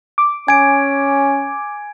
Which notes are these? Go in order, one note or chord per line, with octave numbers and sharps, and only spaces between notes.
D6
C#4 G#5 G#6 D7